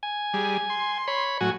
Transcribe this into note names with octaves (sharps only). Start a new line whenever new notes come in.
G#5
G3 G#4
C6
C#5 B5
A2 F#3 F#4 G#5